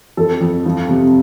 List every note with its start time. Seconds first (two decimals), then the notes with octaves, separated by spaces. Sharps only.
0.17 F2 A4
0.41 F2
0.65 F3
0.89 C3